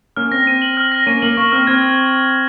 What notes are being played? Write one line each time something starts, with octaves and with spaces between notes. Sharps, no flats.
A#3 C#4 F6
C4 A#6
C4 D#7
F#7
F6
A#6
A#3 C#4 D#7
A#3 F#7
A#3 C#6
C4 F6
C4 G#6